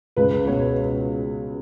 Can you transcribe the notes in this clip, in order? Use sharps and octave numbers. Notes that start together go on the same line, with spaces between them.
C#2 B4
B2 C#5